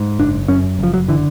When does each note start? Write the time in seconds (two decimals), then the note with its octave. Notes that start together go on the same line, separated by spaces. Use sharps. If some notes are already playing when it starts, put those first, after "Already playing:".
Already playing: G#2
0.19 F#1 D4
0.48 F#2 C#4
0.79 F#1 F3
0.94 F#3
1.08 D3 E3